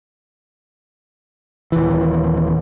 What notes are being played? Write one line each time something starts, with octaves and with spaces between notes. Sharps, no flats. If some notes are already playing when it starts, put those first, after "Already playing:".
D#1 E3